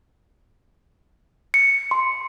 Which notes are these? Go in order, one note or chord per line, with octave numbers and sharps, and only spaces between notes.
C#7
C6